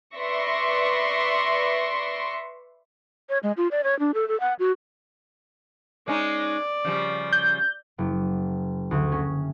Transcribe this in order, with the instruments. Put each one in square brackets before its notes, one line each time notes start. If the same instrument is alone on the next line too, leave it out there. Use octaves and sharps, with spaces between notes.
[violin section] B4 D5 E5 C6 C#6 A#6
[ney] C#5
G#3
F4
D5
C#5
D4
A4
A4
F#5
F#4
[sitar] G#3 C#4 D#4 [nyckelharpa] D5
[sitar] C#3 F3 G3
[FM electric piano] G6
[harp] F#1
D2
C#4